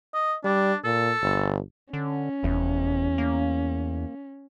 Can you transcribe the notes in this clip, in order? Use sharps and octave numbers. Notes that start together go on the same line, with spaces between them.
D#5
G3 D4
A#2 A4
G1
D3 C#4
F1 E2
A#3